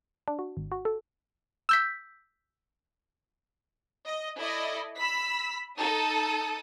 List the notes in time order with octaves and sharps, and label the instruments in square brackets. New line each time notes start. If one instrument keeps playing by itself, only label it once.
[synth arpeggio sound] D4
F#4
G#1
F#4
A4
E6 G6 B6
[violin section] D#5
E4 A4 D5 D#5
B5 E6 B6
D#4 A4 A5 D#6